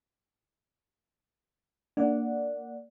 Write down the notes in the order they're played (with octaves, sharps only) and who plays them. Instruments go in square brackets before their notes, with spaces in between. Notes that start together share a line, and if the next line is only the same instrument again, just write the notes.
[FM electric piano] A#3 D5 F#5 [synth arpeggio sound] D4